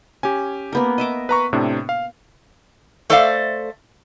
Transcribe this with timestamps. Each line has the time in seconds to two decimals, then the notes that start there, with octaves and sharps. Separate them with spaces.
0.23 C#4 G4 G#5
0.73 A#3 B3 A#4
0.98 D#5 E5 D6
1.29 B4 A#5 C#6
1.53 A2 C3 D4
1.89 F5
3.10 A3 A4 C5 D5 E5 F5